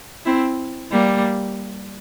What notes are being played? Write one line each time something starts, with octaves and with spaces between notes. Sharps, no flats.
C4 E4
G3 A#3